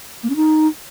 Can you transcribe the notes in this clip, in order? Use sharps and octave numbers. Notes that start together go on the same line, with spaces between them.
A#3
C#4
D#4